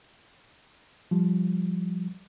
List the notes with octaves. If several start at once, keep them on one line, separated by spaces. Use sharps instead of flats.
F3 G3